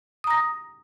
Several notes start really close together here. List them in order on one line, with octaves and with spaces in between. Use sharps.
D#6 A#5 A#6